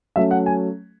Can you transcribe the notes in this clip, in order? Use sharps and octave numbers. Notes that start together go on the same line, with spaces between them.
F#3 A3 C#4 E5
F#5
G#5